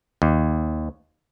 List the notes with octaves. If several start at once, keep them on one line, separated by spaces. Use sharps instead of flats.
D#2